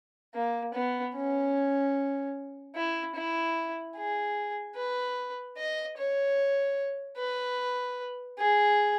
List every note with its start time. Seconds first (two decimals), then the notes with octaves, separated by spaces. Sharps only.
0.34 A#3
0.74 B3
1.15 C#4
2.75 E4
3.15 E4
3.97 G#4
4.76 B4
5.58 D#5
5.98 C#5
7.18 B4
8.39 G#4